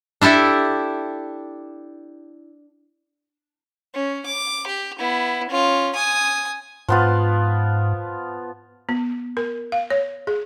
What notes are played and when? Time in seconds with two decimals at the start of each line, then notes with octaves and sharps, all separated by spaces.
0.21 D4 E4 G4 A4 E5
3.94 C#4
4.26 D6
4.67 G4
4.99 B3 E4
5.49 C#4 F4
5.95 G#5 D#6
6.88 G#2 F3 B3 F4
8.89 B3
9.37 A#4
9.72 F5
9.90 C#5
10.27 G#4